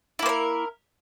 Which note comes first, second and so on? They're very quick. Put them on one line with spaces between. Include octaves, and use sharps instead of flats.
E4 A#3 C5 A#4